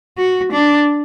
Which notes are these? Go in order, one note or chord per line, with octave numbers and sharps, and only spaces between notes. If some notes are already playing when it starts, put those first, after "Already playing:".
F#4
D4